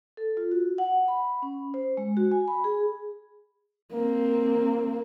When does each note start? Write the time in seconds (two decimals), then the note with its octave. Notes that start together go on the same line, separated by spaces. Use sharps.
0.17 A4
0.37 F4
0.51 F#4
0.78 F#5
1.08 B5
1.42 C#4
1.74 C5
1.97 G#3
2.17 F#4
2.32 G#5
2.48 B5
2.64 G#4
3.94 A#3 C4